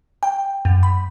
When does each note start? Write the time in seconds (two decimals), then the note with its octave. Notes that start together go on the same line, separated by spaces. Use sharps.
0.23 G5
0.65 F#2
0.83 B5